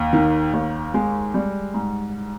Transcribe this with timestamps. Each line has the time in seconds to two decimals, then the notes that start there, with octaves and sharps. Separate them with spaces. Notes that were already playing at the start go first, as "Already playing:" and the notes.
Already playing: D#2
0.13 D#3
0.53 D#2
0.94 G#3
1.34 G3
1.74 G#2